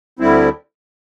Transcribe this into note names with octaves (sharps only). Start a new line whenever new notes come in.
D2 D3 G3 C4 E4